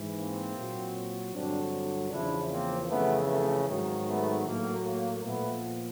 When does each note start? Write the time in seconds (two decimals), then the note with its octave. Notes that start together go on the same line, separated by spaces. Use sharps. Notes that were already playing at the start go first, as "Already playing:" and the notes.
Already playing: G#2 E3
0.16 A#3 C4
0.55 A#2 F#3
1.34 G2 D3 F#3 C4 D4
2.11 E2 C#3 F3 D4 E4
2.51 A#3 C4
2.89 F2 C#3 E3 A3 B3
3.29 A3
3.68 G#2 D#3 F#3
4.07 A3 B3
4.46 A2 F#3 A#3
4.85 A#3
5.24 A#2 F3 A3 B3